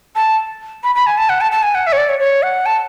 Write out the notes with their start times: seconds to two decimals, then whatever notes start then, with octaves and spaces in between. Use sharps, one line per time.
0.16 A5
0.84 B5
0.95 B5
1.06 G#5
1.18 A5
1.29 F#5
1.41 A5
1.52 A5
1.63 G#5
1.75 F#5
1.87 E5
1.92 C#5
1.98 D5
2.09 C#5
2.20 C#5
2.43 F#5
2.66 A5